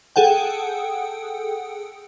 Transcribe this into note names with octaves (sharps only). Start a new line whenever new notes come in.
G#4 A4 F#5 G5